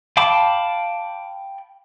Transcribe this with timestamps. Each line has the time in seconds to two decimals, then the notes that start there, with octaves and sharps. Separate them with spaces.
0.17 F5 G5 A5 B5 D6